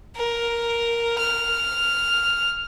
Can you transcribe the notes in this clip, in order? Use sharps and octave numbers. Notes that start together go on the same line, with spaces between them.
A#4
F6